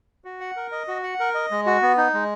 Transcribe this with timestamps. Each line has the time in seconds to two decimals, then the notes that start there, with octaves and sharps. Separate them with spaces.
0.25 F#4
0.41 F#5
0.56 A#4
0.72 D#5
0.88 F#4
1.03 F#5
1.20 A#4
1.34 D#5
1.51 G#3
1.66 F#4
1.82 B3
1.97 D#4
2.14 G#3